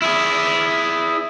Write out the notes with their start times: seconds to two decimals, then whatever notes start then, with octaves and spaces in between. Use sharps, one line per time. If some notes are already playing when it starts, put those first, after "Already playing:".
0.02 E4 G#4